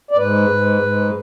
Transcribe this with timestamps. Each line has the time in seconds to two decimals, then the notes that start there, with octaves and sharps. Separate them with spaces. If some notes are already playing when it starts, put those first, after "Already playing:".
0.11 D5
0.17 G#2 B4
0.50 G#2
0.82 G#2